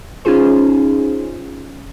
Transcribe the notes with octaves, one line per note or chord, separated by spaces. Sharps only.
C#4 D#4 F4 G#4 C5